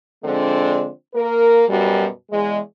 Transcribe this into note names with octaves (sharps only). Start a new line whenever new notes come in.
D3 F3 G#3 C4 D4
A#3 A#4
F#2 B2 G3
E2 G#3